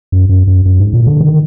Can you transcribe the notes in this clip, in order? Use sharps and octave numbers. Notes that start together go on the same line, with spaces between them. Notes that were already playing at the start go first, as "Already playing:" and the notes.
F#2
F#2
F#2
F#2
G#2
A#2
D3
D#3